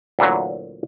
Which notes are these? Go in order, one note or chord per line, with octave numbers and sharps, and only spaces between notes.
D2 A#2 E3 F#3